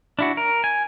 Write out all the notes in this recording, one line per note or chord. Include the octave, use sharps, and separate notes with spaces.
D4 E4 F#4
A#4
G#5